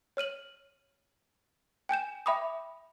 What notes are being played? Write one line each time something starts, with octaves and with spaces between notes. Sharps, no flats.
C#5 F6 D#7 F#7
G5 G#5 G6 E7
E5 G5 B5 D6 D#6